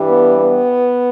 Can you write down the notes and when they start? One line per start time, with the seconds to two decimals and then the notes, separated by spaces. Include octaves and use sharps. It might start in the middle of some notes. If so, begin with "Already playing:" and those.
Already playing: G2 E3 G3
0.09 B3
0.41 B3